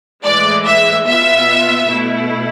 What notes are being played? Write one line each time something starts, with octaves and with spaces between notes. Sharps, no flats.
A2 E3 G#3 D5
E5
B2 B3 F4 E5
B2 A3 E4